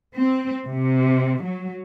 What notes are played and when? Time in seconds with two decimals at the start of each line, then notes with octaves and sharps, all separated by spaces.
0.15 C4
0.68 C3
1.43 F#3